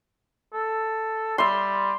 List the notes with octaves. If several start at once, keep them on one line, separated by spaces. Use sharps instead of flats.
A4
G3 E5 C6